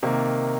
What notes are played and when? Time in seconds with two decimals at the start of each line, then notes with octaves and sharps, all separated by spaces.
0.03 C3 D#3 A#3